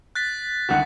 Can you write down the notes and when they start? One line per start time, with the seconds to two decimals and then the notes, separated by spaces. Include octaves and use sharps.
0.15 F#6 A6 B6
0.69 C2 D3 D#3 F#5